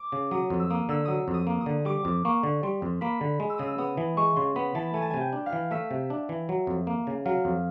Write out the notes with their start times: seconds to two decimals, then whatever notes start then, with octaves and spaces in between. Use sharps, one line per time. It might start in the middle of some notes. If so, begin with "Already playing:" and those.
Already playing: D6
0.12 C#3
0.31 F#3 D#6
0.50 F2
0.60 E6
0.70 A#3 D#6
0.89 D3 E6
1.05 F#3 D#6 E6
1.28 F2
1.34 D#6
1.47 A#3
1.61 D#6
1.66 D3
1.85 G3 D6
2.05 F2
2.25 A#3 C#6
2.43 D3
2.63 G3 C6
2.82 F2
3.01 A#3 B5
3.21 D3
3.40 G#3
3.50 E6
3.58 C#3 D#6
3.67 E6
3.78 B3 D#6
3.97 E3
4.17 G#3 C#6
4.36 C#3 C6
4.56 B3 B5
4.75 E3 A5
4.94 A3 G#5
5.02 A5
5.10 C3 G#5
5.21 G5
5.33 D4
5.46 F5
5.53 E3
5.71 A3 E5
5.91 C3
6.10 D4
6.29 E3
6.49 F#3
6.67 F2
6.87 A#3
7.07 C#3
7.25 F#3 F5
7.45 F2